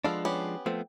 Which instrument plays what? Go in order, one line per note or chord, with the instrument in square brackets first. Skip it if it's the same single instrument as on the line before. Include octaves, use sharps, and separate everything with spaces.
[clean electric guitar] F3 G#3 D4 [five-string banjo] B3 A4 F5
[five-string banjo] B3 C#4 G4
[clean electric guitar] F3 A3 B3 [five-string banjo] C4